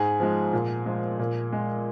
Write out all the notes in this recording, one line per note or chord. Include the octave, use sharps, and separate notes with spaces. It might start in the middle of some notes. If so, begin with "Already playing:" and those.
Already playing: G#2 G#4
F3 G#3
A#2
F3 G#3
A#2
G#3